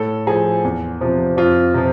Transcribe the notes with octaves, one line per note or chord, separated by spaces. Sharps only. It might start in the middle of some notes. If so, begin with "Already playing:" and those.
Already playing: A2 A4
F3 G#4
E2
C3 F3
F2 F4
C3 F3